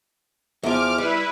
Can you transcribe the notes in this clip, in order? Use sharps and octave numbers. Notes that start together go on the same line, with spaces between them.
E2 F3 D6 F6
G3 E4 B4